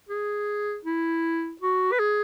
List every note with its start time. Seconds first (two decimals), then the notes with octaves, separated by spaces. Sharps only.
0.09 G#4
0.85 E4
1.61 F#4
1.92 B4
1.99 G#4